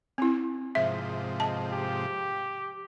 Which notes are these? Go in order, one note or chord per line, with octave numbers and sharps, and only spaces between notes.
C4 E4
G#2 C3 F3 E5
D#5 A5
G4